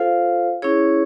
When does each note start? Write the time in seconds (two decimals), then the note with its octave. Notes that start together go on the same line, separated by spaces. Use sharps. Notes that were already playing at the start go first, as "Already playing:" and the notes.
Already playing: F4 A4 C5 F5
0.62 C#4 E4 G#4 C#5